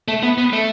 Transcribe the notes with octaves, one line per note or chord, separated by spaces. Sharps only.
A3
B3
B3
A3